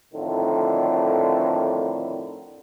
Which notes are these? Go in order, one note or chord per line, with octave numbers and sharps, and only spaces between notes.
F2 A2 D3 D#3